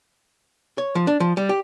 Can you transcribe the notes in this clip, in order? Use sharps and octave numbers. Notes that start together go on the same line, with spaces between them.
C#5
F3
D4
F3
G3
G4